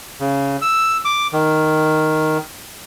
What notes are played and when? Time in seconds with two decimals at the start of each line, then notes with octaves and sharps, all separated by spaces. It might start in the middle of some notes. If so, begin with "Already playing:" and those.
0.20 C#3
0.62 E6
1.05 D6
1.33 D#3